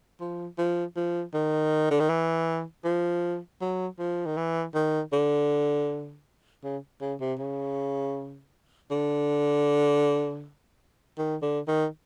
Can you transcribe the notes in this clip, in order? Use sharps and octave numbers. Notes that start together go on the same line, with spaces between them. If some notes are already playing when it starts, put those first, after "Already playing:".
F3
F3
F3
D#3
D3
D#3
E3
F3
F#3
F3
D#3
E3
D#3
D3
C#3
C#3
C3
C#3
D3
D#3
D3
D#3